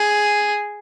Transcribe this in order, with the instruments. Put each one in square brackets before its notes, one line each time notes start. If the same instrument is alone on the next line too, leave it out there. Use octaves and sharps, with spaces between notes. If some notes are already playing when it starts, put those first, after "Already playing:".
Already playing: [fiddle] G#4